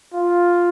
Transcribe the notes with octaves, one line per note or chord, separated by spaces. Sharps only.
F4